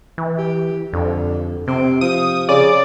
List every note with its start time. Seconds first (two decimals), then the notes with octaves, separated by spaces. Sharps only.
0.18 E3
0.38 G4
0.93 F2 D3
1.67 C3 C4
2.01 F3 D#6
2.49 C#3 D5